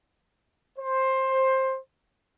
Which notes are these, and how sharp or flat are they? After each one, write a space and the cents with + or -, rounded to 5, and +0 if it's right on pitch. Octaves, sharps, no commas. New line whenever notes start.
C5 +15